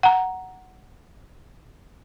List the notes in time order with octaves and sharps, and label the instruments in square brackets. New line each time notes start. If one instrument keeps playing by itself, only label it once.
[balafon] F#5 A#5